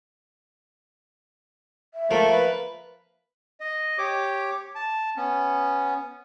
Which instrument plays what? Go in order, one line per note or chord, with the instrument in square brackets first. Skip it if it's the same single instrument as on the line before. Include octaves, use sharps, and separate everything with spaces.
[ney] E5
[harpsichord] F3 A#3 [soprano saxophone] A3
[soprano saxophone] B4
[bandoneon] D#5
G4 C#5 D6
A5
B3 C#4